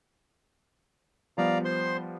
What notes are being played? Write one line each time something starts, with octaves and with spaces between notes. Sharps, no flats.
F3 G3 B3 D5 F5 A#5
C5 C6